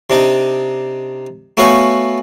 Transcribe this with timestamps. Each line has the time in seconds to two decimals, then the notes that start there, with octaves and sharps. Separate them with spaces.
0.10 C3 D4 D#4
1.57 A3 B3 F#4 C#5 F5 G#5